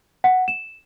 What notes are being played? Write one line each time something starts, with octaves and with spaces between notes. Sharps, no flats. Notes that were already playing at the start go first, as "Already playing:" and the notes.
F#5
E7